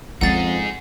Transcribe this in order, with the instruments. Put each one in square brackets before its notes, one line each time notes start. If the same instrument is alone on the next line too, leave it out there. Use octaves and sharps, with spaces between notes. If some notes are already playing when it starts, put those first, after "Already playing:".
[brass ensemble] F2 [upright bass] G#3 C#4 [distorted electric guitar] D#4 G#4 [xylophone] F#5 A6